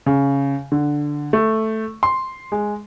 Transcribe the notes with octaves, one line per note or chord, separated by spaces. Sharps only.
C#3
D3
A3
C6
G#3